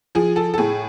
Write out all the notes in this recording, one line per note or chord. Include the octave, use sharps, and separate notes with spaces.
F3 G#4
A4
A4
A2 G#4